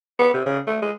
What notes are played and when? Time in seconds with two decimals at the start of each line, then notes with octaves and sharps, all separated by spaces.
0.19 B3
0.34 C3
0.46 C#3
0.67 A3
0.82 G#3